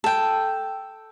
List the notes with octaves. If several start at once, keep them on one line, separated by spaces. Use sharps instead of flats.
A4 G5